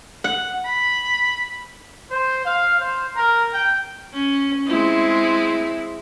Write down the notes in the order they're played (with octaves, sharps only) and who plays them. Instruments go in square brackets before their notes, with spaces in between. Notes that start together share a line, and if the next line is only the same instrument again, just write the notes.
[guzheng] F#5
[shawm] B5
[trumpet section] C5
F5
C5
A#4
G5
[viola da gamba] C#4
G#3 C4 E4